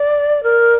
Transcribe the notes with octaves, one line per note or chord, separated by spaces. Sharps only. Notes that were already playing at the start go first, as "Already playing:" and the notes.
Already playing: D5
A#4